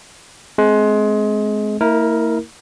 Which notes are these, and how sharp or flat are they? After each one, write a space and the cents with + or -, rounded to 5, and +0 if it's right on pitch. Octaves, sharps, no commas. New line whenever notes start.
G#3 +25 C4 +0
A#3 -40 E4 -30 A#4 +0